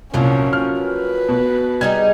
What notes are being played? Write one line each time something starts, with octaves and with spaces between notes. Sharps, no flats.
C2 A#2 F3 F#3 A#3 C#4
F6
B4
B2
G3 D#4 G#4 G#6